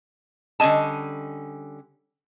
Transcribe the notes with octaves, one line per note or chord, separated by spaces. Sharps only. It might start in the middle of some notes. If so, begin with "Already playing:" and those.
D3 G3 C#4 D#5 A5